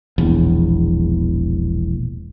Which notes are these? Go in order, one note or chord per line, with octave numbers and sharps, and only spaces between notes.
E1 A#1 E2